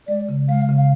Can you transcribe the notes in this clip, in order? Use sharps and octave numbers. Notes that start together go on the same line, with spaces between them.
G#3 D5
C#3
G#3 F5
C#3
F5